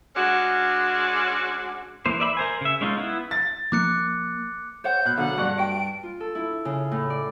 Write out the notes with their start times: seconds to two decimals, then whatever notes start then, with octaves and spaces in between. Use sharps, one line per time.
0.16 G#3 C#4 D4 F#4
2.06 E3 A#3 C5
2.20 D5 E5 B5
2.37 A#4 C5 G#5
2.61 C#3 E5
2.81 G#3 C#4 D#4 F4
2.98 B3 E4
3.31 A6
3.72 F3 A#3 D6 F#6 C#7
4.84 C5 C#5 F#5 G6
5.05 B2 F#6
5.17 B2 D3 F#3 F5 F#5
5.38 G2 D4 F#4
5.58 F#4 G5 D7
6.03 F4
6.20 A4
6.35 E4
6.65 C#3
6.91 A2
7.10 D5